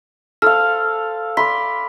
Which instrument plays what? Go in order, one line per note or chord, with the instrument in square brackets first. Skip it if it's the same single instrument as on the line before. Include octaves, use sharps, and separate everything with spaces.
[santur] A4 C5 F5 [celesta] F6
[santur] D5 B5 C6 [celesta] B6